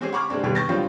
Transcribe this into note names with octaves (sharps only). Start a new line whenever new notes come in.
G#3 C4 C#4 G4 G#4
F#5 B5 C#6 D6 F6 G#6
C3 G#3 A3 C4 D4
D#2 B2 G3 G#4 B4
C#6 G6 A6 A#6
A2 D3 F#3 G3 C4 F4